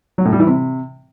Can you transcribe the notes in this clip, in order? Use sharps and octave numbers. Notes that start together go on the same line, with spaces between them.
F#3
A2
G3
E3
C3